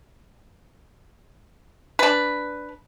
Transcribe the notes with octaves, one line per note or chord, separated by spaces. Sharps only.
D4 B4